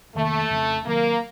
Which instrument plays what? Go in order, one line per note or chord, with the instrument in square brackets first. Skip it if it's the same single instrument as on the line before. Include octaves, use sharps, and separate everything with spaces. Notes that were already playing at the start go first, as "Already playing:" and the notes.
[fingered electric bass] F2 C3 D#3 A#3 [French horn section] A3
[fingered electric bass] F2 C#3 F3 C4
[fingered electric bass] C3 D#3 F#3 C4 [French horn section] A#3